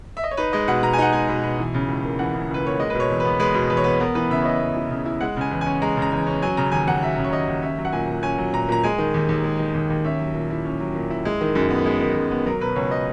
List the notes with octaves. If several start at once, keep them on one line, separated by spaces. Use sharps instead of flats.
E5
D#5
C#5
D#4 B4
G#3 D#5
B2 F#5
B2 A#5
G#5
D#4 F#5
G#3 G#5
B2
B2
E3
C#3
C#2
A#3
E3 F#5
C#3
C#2 B4
A#3 C#5
G#3 D#5
B2 B4
C#5
E2
B4
B3
G#3 B4
B2
E2 B4
C#5
B3 B4
B3 A#4
E3 B4
C#3 E5
C#5
E4 D#5
B3
E3
C#3
E4
G#3 F#5
C#3 G#5
E2
G#5
C#4
G#3 A#5
C#3
A#5
E2
C#4
F#3 G#5
C#3 A#5
D#2 G#5
D#2 F#5
F#3 E5
C#3
C#5
D#2 D#5
D#2
C#4 E5
F#3
F#5
A#2 G#5
A#2
C#4 G#5
F#3
A#2 A#5
A#2 A#5
G#3 G#5
D#3
D#2
D#2
G#3
D#3
D#2
D#2
C#4 E5
F#3
A#2
E4
C#4
F#3
A#2
E4
G#3
D#3
F#2
B3
G#3
D#3
F#2
B3
F#3 A#4
B2 B4
C#2 C#5
D#5